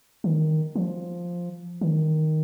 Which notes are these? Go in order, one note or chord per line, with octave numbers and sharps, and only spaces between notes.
D#3
F3
D#3